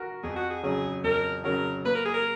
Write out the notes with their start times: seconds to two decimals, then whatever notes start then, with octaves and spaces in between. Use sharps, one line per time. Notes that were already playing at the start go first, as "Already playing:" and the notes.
Already playing: F#4 A#4
0.23 F2 G#4
0.36 F#4
0.50 G#4
0.63 C#3 F#3 G#4
1.04 F2 A#4
1.44 C#3 F#3 A#4
1.85 A#3 B4
1.95 A#4
2.05 G#4
2.14 A#4